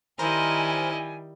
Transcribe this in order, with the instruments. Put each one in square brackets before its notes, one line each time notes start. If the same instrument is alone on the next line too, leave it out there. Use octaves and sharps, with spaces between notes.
[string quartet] D#3 G3 [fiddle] E4 D#5 [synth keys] A#4 C5 [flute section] G#5